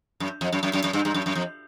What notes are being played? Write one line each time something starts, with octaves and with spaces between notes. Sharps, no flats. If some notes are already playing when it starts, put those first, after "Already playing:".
F#2
F2
F#2
F#2
F#2
F#2
G2
G2
F#2
F#2
F2